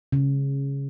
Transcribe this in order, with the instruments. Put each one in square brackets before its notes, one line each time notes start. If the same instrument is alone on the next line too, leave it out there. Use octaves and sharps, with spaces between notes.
[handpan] C#3